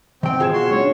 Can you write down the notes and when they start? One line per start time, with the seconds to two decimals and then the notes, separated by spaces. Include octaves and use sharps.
0.23 D#3 C4 G5
0.40 B2 F4 G#4 G#6 E7
0.53 F#4 C6
0.71 A3 C#4 D4 C#5